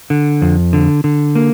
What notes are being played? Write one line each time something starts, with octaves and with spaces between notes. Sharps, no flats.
D3
F2
D3
D3
A#3